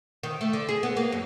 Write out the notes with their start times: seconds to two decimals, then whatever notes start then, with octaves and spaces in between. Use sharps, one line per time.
0.23 D#3
0.41 A3
0.53 D3
0.69 G#4
0.83 B3
0.97 A#3
1.12 F#2